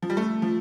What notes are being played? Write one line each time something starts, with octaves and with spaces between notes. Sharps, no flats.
F3
G3
A3
F3